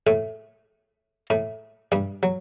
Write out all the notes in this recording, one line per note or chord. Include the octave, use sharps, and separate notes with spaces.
A2 A3
A2 A3
G2 G3
F#3